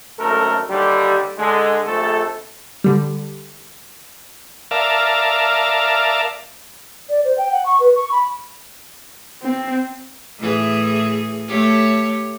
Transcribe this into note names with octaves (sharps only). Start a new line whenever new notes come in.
G#1 F#2 A3 A4 A#4
D#2 D3 G3
D3 G#3
A#1 F2 A3 A4
D3 G3
A#4 D5 E5 F5 A5
D5
C5
G5
F#5
C#6
B4
C#6
B5
C4
A2 E3 G#4
A3 G4 C#5